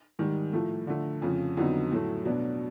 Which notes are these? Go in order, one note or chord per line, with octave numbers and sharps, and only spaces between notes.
G#2 D#3 G3
A2 F3 A3
D3 F3 A3
F2 C#3 F3
F2 D3 F#3 B3 D#4
A2 F#3 A3
B2 F#3 B3 D4